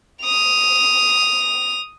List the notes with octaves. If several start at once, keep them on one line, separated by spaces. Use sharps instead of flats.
D#6 F7